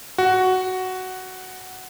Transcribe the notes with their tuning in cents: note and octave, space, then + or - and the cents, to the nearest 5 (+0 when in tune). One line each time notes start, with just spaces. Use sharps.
F#4 +5